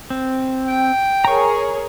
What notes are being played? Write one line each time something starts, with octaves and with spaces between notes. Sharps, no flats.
C4
G5
G#4 A#4 C#5 A#5 C#6